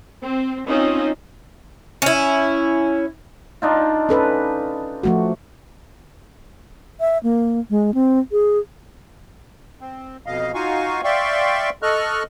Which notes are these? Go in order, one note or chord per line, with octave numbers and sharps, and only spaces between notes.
C4
C4 C#4 D#4 F4
C#4 E4
D4 D#4 F4
C#4 A4 B4
F3 A3 F#4
E5
A#3
G#3
C4
G#4
C4
F2 B2 D#5 F5
D#4 F4 F#4 F5 G#5 C#6
D5 E5 F5 G5 C6 C#6
A4 D#5 C#6 F6 F#6